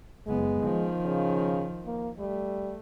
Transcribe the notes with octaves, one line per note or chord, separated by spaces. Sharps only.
F#1 G#3 B3
D#3 F3
C#3
A#3
G3 A3